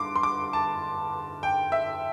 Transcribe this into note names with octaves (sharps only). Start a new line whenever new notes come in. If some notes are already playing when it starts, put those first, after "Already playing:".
Already playing: G2 D3 C6 D6
C6
D6
A5
G5
E5